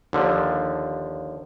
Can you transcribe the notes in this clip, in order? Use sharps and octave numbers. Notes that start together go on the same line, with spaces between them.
D#2 D3 F3